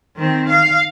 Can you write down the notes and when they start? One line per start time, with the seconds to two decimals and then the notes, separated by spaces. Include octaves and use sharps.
0.17 D#3 C4
0.50 F5